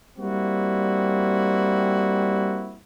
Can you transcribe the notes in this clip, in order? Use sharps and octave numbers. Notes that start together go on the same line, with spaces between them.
G3 A#3 C4 E4 F#4